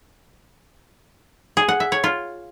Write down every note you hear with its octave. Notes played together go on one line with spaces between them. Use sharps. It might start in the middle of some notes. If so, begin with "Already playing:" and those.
G#4
F#5
E5
C#5
F4